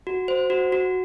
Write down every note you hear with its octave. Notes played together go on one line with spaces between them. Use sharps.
F#4
C5
F#4
F#4